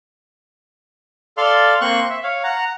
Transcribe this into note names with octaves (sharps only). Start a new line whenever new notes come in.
A4 D5 F5 C6 F6
A#3 C4 C6 C#6 F#6
E5
C#5 F5
F#5 A#5